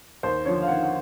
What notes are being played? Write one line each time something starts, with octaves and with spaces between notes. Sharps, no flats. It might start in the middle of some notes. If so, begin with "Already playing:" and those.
D#2 C5
D3 F3 C#5
F5
D#2 F#5
F#5